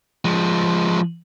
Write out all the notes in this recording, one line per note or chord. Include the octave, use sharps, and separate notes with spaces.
F3 G#3